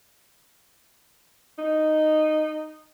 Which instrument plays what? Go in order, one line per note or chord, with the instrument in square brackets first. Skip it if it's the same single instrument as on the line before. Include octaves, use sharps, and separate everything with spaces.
[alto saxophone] D#4